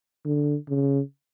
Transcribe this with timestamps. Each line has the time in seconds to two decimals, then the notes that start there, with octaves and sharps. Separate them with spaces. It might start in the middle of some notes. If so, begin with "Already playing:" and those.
0.25 D3
0.69 C#3